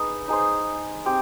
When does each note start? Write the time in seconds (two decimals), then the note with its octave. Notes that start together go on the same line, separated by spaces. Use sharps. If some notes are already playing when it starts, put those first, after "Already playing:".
Already playing: D#4 G#4 B4
0.28 D#4 G#4 C5
1.06 C4 G4